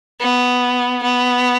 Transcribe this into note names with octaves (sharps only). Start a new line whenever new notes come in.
B3
B3